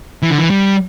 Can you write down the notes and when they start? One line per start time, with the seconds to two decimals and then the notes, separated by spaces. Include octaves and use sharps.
0.23 E3
0.31 D3
0.39 E3
0.50 G3